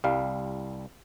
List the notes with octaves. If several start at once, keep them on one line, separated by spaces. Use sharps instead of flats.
C2 G3 F5